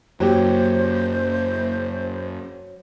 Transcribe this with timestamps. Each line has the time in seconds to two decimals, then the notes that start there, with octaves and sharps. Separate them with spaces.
0.20 F#2 F#3 A#3 G4 C5